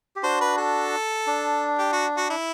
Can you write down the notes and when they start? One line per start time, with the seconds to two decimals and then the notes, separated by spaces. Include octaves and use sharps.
0.16 G4
0.23 D4 F#4 C5
0.41 B4
0.58 A4
1.27 D4
1.78 G4
1.92 F#4
2.17 F#4
2.30 E4